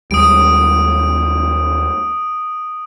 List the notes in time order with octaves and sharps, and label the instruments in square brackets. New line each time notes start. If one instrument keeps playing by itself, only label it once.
[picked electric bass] D#2 G3 G#3 [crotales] D#6 D7